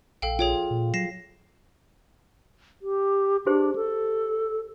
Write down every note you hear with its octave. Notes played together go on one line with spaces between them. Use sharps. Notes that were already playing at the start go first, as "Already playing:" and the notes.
A#1 A4 F5 G5
F4 G#4 C#5 G5
A#2
F#3 A#6 C7 E7
G4
D4 G4 G#4 C5
A4